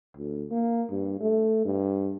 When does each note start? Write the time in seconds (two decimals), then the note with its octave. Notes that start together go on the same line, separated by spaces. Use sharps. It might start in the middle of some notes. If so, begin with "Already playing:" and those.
0.17 D2
0.51 A#3
0.90 G2
1.21 A3
1.65 G2